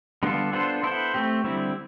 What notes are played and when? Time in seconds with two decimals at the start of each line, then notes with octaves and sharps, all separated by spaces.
0.23 D3 G3 B3 F4 A4
0.53 B3 D4 F4 A4 C5
0.83 B3 E4 A4 C5
1.14 A3 C4 G4
1.44 D3 G3 C4 E4